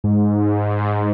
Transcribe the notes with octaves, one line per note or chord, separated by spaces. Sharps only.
G#2